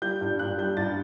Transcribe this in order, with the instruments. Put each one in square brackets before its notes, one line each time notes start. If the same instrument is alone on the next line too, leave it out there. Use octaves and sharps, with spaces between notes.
[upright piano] G3 G6
G2
G2 F#6
G3 G6
G2 A6